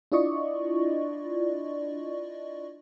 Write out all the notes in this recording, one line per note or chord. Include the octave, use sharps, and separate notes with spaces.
D4 E4 F4 D5 D#5 C#6